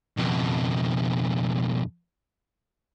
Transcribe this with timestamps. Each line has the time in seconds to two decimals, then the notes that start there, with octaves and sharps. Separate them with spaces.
0.18 F2 B2